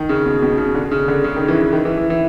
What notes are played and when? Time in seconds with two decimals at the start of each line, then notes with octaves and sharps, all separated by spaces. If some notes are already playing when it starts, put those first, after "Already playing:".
Already playing: D#3
0.09 C#3
0.26 B2
0.42 B2
0.58 C#3
0.75 D3
0.91 C#3
1.08 D3
1.24 C#3
1.36 D#3
1.48 E3
1.61 E3
1.73 D#3
1.85 E3
1.97 E3
2.10 E3